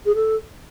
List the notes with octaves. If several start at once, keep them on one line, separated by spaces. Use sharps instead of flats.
G#4
A4